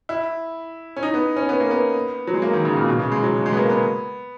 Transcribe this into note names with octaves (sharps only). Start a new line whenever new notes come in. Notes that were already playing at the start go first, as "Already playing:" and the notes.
E4
C#4
D#4
B3
C#4
B3
A#3
B3
F#3
G#3
A#3
D#3
C#3
A#2
B2
C#3
G#3
F#3
G#3
B3
A#3
B3